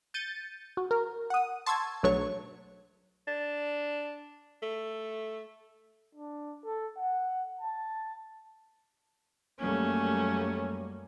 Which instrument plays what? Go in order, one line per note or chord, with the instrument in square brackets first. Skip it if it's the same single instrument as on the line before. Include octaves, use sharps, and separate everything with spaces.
[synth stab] G6 A6 C#7 D#7
F#4
A#4
F#5 D#6
A5 C6 C#6 E6 G#6
B1 F#3 A3 D4 C#5 C#6
[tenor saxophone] D4
A3
[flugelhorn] D4
A4
F#5
A5
[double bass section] F#2 G3 A#3 [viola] A3 C#4